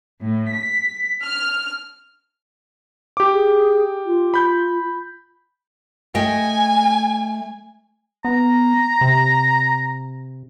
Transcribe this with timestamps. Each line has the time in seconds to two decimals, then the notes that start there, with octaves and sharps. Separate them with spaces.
0.22 A2
0.55 B6
1.24 F6
3.17 G4 D6
3.33 G#4
4.06 F4
4.34 B5 G6
6.15 A3 D#5 G5 G#5
8.25 B3 A#5
9.01 C3